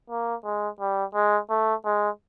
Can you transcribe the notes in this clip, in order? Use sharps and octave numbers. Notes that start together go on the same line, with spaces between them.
A#3
G#3
G3
G#3
A3
G#3